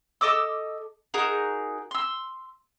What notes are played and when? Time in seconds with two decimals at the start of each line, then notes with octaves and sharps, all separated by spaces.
0.21 A4 D#5 D6 E6
1.14 D#4 F#4 G#4 A#4
1.91 C6 E6